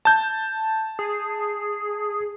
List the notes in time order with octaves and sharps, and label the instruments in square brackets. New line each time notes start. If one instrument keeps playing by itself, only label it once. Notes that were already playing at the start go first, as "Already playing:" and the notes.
[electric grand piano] A5 G6
[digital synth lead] G#4